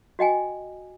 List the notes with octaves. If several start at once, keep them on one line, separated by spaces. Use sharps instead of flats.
F#4 D#5 G5 G#5